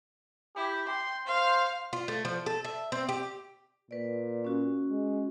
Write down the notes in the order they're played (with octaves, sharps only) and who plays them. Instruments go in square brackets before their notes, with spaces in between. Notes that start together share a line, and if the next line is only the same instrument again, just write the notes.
[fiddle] E4 [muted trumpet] G4
[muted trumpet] G5 [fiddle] C6
[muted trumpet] C5 [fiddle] F5
[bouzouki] F4
A3
F3
A4
E5
C4
G4
[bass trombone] A#2 [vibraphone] B4 D5
[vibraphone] C#4 F#4
[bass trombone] G#3